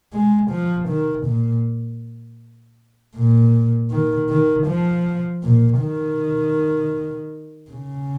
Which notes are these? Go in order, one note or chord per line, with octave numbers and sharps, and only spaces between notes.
G#3
F3
D#3
A#2
A#2
D#3
D#3
F3
A#2
D#3
C#3